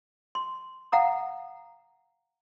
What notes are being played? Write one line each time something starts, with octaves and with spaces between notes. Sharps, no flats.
C6
F5 F#5 A#5 D#6